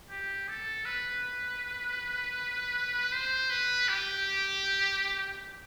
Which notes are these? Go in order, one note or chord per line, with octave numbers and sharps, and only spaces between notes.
G4
A4
B4
C5
B4
G4